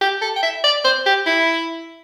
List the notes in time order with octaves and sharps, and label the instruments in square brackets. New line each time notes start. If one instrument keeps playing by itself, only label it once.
[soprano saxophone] G4
A4
G5
E5
D5
C5
G4
E4